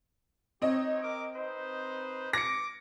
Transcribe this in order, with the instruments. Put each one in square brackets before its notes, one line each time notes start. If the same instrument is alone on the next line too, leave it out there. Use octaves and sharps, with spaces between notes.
[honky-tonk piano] C4 D#5 [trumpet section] D#4 G4 C#5
[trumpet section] A#4 D6
D#4 B4 C5
[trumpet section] D6 [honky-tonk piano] A#6 C#7